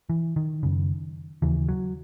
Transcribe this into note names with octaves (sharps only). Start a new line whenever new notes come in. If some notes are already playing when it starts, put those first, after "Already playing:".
E3
D#3
F#2 C#3
D#2 C#3 E3
F#3